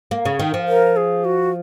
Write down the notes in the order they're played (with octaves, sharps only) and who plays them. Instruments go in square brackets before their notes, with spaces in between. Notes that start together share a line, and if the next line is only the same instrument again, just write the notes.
[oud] A#3
C#3
D#3
F3
[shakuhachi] A#4
G#4
F#4